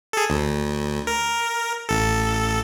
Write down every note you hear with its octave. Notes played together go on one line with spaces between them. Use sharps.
G#4 A4
D2
A#4
A1 A4